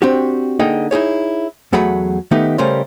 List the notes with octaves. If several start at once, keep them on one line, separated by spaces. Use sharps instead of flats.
C4 D4 F#4 G4
D3 A#3 D#4 G#4 D#5 G5
D#4 E4 G#4 C#5
E2 F#3 A3 G#4 F#5 B5
D#3 A3 B3 D#4 G4
C#3 G3 A3 C#4 A#4 C5